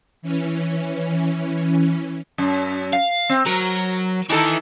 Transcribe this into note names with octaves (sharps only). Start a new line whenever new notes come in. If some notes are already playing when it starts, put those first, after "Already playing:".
E3 C#4
F#2
F5
C4
F#3 A#4
D#3 E3 D#4 A4